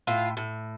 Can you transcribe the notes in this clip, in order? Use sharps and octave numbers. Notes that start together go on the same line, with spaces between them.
A2 F4
A2